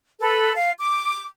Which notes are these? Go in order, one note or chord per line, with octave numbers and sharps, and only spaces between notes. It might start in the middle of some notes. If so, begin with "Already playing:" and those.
A4 B4
F5
D6